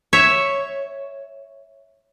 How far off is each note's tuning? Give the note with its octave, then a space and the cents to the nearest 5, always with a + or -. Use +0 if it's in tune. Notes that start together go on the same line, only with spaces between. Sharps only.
C#5 +0 E5 +0